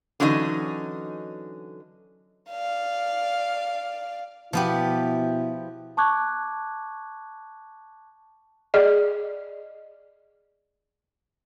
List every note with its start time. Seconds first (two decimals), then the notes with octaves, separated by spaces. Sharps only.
0.20 D3 E3 F#3 C#4 D#4 D#5
2.50 D5 F5
4.53 B2 F3 B3 E4 G4
5.97 A5 C#6 D6 F#6 G#6
8.74 G#4 D5 D#5